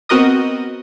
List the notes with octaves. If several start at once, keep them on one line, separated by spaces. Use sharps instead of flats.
B3 C4 F#4 A#4 D#5 D#6